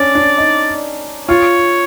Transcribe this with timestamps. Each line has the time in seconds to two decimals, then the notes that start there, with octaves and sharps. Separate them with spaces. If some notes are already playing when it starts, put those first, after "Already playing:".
Already playing: C#4 D4 D5
0.15 D4
0.38 D#4
1.28 F4 C#5